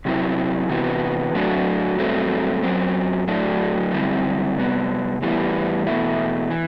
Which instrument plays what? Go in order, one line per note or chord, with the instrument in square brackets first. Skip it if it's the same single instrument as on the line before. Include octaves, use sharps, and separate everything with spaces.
[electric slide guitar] C3 F#3 C4 E4
C3 E3 B3 F#4
A2 F#3 A3 D4 F#4
G2 F#3 A3 C4
F#2 F#3 C4
A2 F#3 A3 D4
F#2 D3 G3 C4 E4
C3 G3 B3
A2 E3 G3 B3 E4
E2 B2 A3 E4
E3